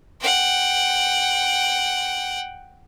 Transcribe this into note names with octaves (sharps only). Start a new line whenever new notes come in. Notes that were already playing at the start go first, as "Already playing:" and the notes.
F#5 G5